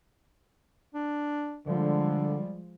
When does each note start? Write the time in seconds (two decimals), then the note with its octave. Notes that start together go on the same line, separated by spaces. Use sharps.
0.94 D4
1.66 D3 F3 G3 G#3